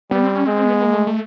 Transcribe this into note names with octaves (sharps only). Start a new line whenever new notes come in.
G3 B3
C4
C#4
G#3 C4
B3
A#3
A3
A3